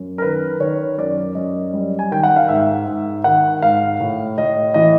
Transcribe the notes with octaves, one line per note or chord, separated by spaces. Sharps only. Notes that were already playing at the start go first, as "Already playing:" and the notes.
Already playing: F#2
A#4
D#3 B4
D#3 C#5
F#2 D5
F#2 D#5
G3
G#5
D#3 G5
F#5
F5
G#2 E5
G#2
D#3 F#5
G#2 F5
A2
A2 D#5
E3 D#5